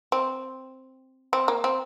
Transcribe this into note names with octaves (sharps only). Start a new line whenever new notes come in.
C4
C4
A#3
C4